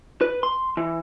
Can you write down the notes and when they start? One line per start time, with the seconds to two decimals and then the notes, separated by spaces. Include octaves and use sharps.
0.21 B4
0.43 C6
0.77 E3